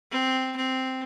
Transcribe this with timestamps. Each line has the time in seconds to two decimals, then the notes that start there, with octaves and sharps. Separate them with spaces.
0.11 C4
0.56 C4